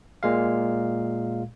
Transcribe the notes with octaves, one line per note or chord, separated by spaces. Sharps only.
A#2 G#3 F5